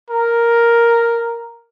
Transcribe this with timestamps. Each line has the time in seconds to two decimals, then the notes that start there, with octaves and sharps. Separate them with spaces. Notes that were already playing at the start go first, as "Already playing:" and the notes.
0.10 A#4